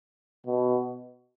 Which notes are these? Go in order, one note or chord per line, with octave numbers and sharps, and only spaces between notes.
B2